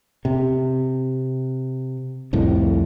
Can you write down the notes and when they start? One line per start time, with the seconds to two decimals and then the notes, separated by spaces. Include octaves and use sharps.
0.25 C3
2.33 C2 F2 A2